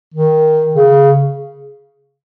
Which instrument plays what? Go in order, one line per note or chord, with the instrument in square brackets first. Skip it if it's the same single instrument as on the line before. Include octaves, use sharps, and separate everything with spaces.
[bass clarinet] D#3
C#3